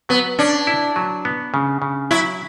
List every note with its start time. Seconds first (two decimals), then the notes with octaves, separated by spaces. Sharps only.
0.09 F#3 B3
0.39 C#4 D4
0.67 E4
0.96 F#3
1.25 B3
1.54 C#3
1.82 C#3
2.11 F#3 E4